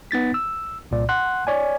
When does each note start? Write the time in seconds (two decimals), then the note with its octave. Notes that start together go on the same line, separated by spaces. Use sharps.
0.11 B3 D#4 A6 B6
0.34 E6
0.91 C2 A#2 D5
1.09 F#5 C6 F#6
1.47 C#5 D5 G#5